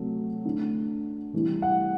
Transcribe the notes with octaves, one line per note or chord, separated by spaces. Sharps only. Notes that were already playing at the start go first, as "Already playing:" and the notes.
Already playing: C3 F#3 A3
D3 A3
C3 E3 G3
F#5